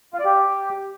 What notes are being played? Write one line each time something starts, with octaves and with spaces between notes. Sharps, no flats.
F4
D5
G4